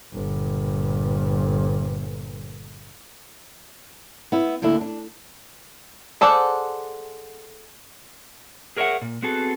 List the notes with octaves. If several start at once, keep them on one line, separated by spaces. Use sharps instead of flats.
G1 A#2
B3 E4
D2 D3 A#3 D4 E4
D4
G#4 A4 C5 D5 F#5
G#4 A#4 C#5 D#5 E5 F#5
A#2
B3 C4 F#4 G#4 A4